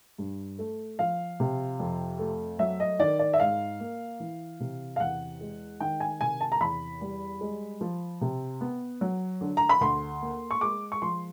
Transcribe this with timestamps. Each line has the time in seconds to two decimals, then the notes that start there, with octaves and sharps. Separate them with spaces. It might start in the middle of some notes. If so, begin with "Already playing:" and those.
0.18 G2
0.58 A3
0.99 F3 F5
1.40 C3
1.80 F2
2.19 A3
2.59 F#3 E5
2.80 D#5
2.99 D#3 D5
3.19 D5
3.33 E5
3.39 G#2 F5
3.80 A#3
4.20 E3
4.60 C3
4.96 F5
5.00 E2 F#5
5.41 G#3
5.80 D#3 G5
6.00 G#5
6.21 C3 G#5
6.41 A5
6.52 A#5
6.60 E2 B5
7.01 G3
7.41 G#3
7.81 F3
8.21 C3
8.61 B3
9.01 F#3
9.41 D3
9.57 A#5
9.69 B5
9.81 D2 C6
10.22 A#3
10.51 C#6
10.61 G#3 D6
10.92 C#6
11.02 F3 C6